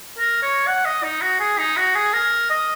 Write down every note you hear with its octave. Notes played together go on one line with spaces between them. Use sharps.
A#4
C#5
F#5
D#5
D#4
F#4
G#4
D#4
F#4
G#4
A#4
D#5